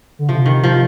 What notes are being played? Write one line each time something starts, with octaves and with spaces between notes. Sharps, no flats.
D3
C3 F3
D#3
F3